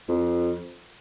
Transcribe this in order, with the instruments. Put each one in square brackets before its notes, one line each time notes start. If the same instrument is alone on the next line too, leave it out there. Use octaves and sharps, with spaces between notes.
[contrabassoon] F2